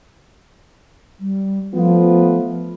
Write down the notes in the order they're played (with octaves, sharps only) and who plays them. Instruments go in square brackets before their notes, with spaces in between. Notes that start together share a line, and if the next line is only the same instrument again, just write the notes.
[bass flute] G3
[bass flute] F3 [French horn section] A3 B3 F4